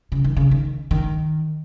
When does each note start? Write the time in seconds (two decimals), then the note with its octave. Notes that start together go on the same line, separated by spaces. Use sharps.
0.12 C#3
0.24 D#3
0.37 C#3
0.51 D#3
0.91 D#3